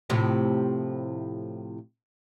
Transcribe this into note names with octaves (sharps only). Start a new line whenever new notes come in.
A2 C3 F3